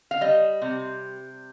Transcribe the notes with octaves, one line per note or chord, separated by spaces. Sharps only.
F5
G3 D#5
C3